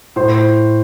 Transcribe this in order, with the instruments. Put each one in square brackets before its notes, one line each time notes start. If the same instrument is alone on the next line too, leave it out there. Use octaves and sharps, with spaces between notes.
[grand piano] A2 C5